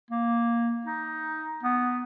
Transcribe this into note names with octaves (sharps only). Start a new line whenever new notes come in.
A#3
D#4
B3